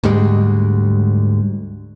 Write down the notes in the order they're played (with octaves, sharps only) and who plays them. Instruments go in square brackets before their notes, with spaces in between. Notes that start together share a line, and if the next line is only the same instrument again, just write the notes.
[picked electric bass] D2 G#2 G3 G#3